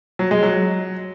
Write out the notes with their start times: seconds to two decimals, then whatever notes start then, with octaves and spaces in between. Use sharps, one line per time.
0.19 F#3
0.31 G#3
0.43 F#3